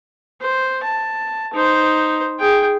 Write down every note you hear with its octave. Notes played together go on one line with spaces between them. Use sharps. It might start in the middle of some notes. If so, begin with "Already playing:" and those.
C5
A5
D#4 C5
G#4 G5